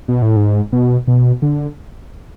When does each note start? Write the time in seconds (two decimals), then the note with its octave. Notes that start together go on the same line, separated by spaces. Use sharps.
0.08 B2
0.22 A2
0.36 G#2
0.73 B2
1.08 B2
1.42 D3